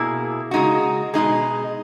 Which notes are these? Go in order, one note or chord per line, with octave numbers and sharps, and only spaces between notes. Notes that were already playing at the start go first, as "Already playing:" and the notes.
Already playing: B2 A#3 E4 G#4
C#3 G#3 D#4 F#4
B2 G#3 D#4 G#4